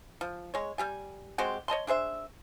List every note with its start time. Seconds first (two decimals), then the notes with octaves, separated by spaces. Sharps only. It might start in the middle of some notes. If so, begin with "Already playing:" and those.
0.21 F3
0.54 G#3 C#5
0.78 G3 G4 G#5
1.38 G#3 C4 F#4 G4
1.68 C#5 D#5 A5 C6
1.87 D4 G#4 C5 E5